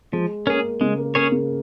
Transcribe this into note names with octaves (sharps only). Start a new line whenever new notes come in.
F3 G#3
A#3 C#4 G#4
C#3 G#3
A#3
A#3 C#4 G#4 C#5
C#3